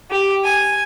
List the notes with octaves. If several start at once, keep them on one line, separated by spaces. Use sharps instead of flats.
G4
G#5